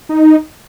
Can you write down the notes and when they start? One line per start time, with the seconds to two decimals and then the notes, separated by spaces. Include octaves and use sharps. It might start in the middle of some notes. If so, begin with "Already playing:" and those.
0.09 D#4